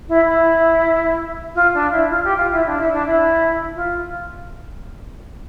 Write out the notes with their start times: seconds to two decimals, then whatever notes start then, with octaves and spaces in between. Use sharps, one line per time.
0.09 E4
0.26 E4
1.55 F4
1.74 D4
1.92 E4
2.11 F4
2.24 G4
2.37 F4
2.52 E4
2.66 D4
2.79 E4
2.93 D4
3.07 E4
3.75 F4